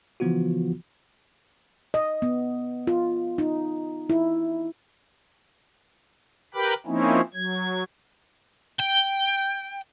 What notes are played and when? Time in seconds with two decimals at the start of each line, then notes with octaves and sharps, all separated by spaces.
0.20 C#3 E3 F3 B3 F4 F#4
1.94 D#5
2.22 B3
2.87 F4
3.38 D#4
4.10 E4
6.54 G4 A#4 B4 G5 B5 D6
6.86 F3 A#3 C4 C#4 D#4 E4
7.34 F#3 G#6
8.79 G5